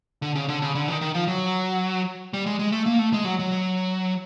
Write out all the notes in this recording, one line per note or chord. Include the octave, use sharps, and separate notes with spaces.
D3
C#3
D3
C#3
D3
D#3
D#3
F3
F#3
G3
G#3
G#3
A3
A#3
A3
G#3
F#3
F#3